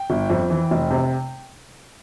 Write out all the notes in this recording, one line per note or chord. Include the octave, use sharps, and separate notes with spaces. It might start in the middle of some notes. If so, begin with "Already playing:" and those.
Already playing: G5
G1
F2
E3
F1
C3